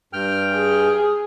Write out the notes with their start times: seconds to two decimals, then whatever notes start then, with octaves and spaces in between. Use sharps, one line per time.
0.13 G2 G5 F6
0.54 G#4